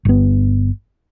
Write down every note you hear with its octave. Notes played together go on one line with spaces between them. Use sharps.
G1 B3